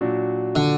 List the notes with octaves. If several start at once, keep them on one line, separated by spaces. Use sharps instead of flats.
A#2 F#3 D4 F#4
D3